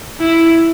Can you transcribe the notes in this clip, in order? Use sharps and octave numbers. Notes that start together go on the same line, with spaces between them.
E4